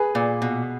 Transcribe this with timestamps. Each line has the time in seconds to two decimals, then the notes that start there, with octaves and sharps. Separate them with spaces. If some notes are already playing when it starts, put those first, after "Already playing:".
Already playing: G#4 B4
0.15 A#2
0.42 B2